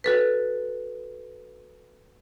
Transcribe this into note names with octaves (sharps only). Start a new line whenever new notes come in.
F#4 A4 B4